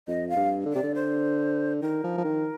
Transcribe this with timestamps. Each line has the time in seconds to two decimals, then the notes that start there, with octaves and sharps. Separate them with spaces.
0.08 F2 D#5
0.29 F5
0.36 G2
0.66 D3
0.73 C3 D5
0.83 D3
0.95 C5
1.82 D#3 A#4
2.04 F3
2.18 F3
2.25 D#3